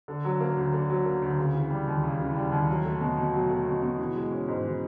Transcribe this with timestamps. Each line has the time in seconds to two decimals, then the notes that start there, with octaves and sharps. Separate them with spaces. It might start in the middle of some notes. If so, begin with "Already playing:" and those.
0.08 D3
0.24 F#3
0.40 A#3
0.57 D2
0.73 D3
0.90 F#3
1.06 A#3
1.22 D2
1.39 C#3
1.54 E3
1.70 G3
1.88 D#2
2.04 C#3
2.19 E3
2.36 G3
2.52 D#2
2.69 F#3
2.85 A3
3.01 B2
3.17 B2
3.34 F#3
3.50 A3
3.66 B2
3.82 B2
3.99 E3
4.15 G#3
4.32 C#4
4.48 G#2
4.65 E3